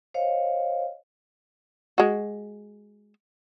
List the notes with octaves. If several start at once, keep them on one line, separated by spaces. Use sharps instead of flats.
C5 C#5 D#5 F5
G#3 F#4